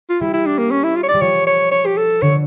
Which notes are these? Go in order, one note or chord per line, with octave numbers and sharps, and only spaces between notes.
F4
G3 E4
E4
D4
A#3
C#4
E4
F4
C#5
D5
G3
F3 C#5
C#5
C#5
G4
A4
D3 C#5